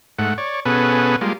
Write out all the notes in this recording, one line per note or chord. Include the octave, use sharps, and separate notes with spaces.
G#2 A3 F#5
C#5 D5
B2 B3 C#4 G#4 A4 B4
G3 G#3 A#3 F4